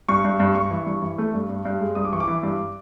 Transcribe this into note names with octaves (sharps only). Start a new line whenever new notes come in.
G2 C#6
G2
G2
G2 C#6
E3
G2
E3
A3
G2
G2
G2
G#3
G2 D#6
D6
E3 C#6
D6
E3
G2